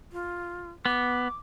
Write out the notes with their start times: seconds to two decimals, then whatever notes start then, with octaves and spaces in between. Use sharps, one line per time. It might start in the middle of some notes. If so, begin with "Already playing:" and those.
0.12 F4
0.86 B3 D6